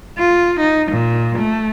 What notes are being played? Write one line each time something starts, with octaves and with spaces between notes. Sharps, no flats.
F4
D#4
A#2
A3